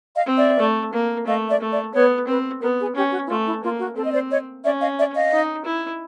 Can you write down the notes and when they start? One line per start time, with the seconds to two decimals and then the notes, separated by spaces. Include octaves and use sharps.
0.14 D#5 F5
0.26 C4
0.37 D5 E5
0.59 A3
0.93 A#3
1.26 A3 D#5 F5
1.49 D5 E5
1.60 A3
1.71 D5 E5
1.94 B3 B4 C#5
2.27 C4 B4
2.62 B3 A#4
2.79 G#4
2.95 C#4 G4
3.12 F#4
3.25 E4
3.29 A3 F4
3.47 E4
3.63 A#3 F4
3.79 F#4
3.96 C4 A4
4.06 D#5
4.13 C5 D5
4.31 C#5 D#5
4.63 C#4 D5 E5
4.81 D#5 F5
4.98 D5 E5
5.15 D#5 F5
5.32 D#4
5.65 E4